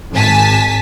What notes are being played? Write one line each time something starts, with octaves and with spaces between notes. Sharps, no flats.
G#1 G#5 A5 B6